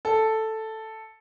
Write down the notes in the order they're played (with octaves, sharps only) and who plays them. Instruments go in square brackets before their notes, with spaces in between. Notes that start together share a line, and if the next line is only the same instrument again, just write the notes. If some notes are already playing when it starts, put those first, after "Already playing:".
[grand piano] A4